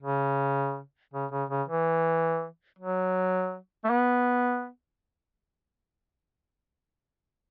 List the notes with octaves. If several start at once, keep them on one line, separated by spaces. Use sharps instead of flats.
C#3
C#3
C#3
C#3
E3
F#3
A3
B3